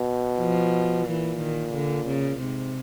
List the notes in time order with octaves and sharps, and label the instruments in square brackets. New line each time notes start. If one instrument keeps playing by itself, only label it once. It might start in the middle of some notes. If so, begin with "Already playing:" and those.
Already playing: [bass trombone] B2
[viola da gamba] F3
[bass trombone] A#2 [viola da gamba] E3
[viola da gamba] D#3
D3
C#3
[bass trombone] G#2 [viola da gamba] C3